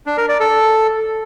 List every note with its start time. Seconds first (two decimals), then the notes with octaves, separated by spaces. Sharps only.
0.06 D4
0.17 A#4
0.29 D5
0.40 A4